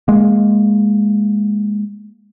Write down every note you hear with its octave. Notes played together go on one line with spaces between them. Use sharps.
G#3 A#3